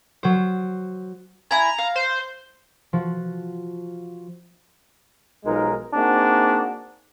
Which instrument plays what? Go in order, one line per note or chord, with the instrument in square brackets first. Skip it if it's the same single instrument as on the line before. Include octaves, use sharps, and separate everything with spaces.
[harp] F#3 C5
[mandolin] E4 G#5 [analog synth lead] A#5
[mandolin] F5
[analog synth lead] C5
[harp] F3 F#4
[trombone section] B1 F3 G#3 D#4 A#4
A#3 C4 D4 D#4 F#4 G#4